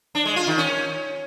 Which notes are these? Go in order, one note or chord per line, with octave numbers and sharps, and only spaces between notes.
D4
G#3
F4
D#3
C#4